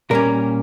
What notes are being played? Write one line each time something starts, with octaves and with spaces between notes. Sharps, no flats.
A#2 G3 A#3 C#4 A#4